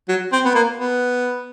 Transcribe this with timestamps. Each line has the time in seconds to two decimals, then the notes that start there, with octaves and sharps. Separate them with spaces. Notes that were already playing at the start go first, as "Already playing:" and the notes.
0.08 F#3
0.32 C4
0.45 B3
0.55 A#3
0.77 B3